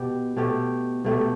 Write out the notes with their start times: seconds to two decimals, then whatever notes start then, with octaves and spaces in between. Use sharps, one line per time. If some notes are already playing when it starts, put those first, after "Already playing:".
Already playing: B2 G4
0.36 B2 A3 G4
1.04 B2 A3 G4